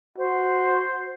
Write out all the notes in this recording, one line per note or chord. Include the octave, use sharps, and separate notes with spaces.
F#4 C5